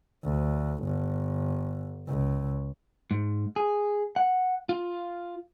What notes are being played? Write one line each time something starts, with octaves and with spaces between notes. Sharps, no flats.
D2
G1
C#2
G#2
G#4
F#5
F4